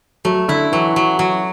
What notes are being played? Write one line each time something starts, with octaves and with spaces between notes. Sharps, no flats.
F#3 A3
D3 E4
E3 F#3
F#3
F#3